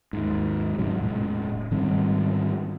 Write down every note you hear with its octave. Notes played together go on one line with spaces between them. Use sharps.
D#2 G#2
G#2 C3 F#3
E1 A2 G#3
G#2 D#3 G3 C4